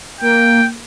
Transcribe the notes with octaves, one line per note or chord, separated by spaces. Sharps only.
A#3 G5